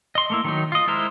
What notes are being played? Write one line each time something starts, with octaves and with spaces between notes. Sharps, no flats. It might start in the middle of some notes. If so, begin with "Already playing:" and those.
D#5 C6
A3 A#3 E4
D#3 F#3 D#4
F4 D#5
G#3 E4 A#4 C5